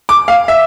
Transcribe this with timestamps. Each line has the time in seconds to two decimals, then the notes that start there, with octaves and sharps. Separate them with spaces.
0.09 D6
0.28 F5
0.48 E5